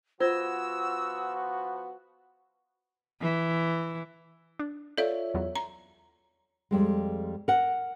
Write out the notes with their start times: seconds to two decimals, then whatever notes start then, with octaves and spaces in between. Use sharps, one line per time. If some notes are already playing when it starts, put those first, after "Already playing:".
0.20 F3 B3 F4 F#4 C5 E6 G#6 A#6
3.21 E3
4.59 D4
4.98 F4 A4 C#5 D5 E5 F5
5.34 E2 F#3 B3
5.56 A#5 C6
6.71 F2 G3 G#3
7.48 A#4 F#5